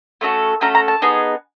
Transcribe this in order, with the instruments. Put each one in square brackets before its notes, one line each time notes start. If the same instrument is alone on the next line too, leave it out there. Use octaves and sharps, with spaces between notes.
[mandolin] A3 C#4 F#4 A4
A3 C#4 F#4 A4 A#5
A#5
A5
B3 D#4 G#4